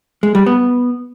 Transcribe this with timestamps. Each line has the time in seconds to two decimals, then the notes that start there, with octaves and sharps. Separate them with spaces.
0.23 G#3
0.35 G3
0.46 B3